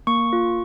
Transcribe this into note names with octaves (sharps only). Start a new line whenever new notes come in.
A#3 C#6
F4